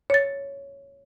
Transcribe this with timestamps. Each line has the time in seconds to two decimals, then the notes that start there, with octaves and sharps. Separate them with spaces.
0.10 C#5 A6